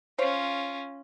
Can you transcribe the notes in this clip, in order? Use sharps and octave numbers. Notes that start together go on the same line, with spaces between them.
C#4 F4 C5 C#5 F5